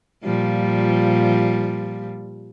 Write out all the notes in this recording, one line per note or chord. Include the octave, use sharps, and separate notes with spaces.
A#2 F3 G3